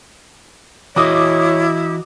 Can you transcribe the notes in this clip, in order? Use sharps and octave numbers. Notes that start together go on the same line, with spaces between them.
E3 E4 F#4 C#5 D#5 D6 D#6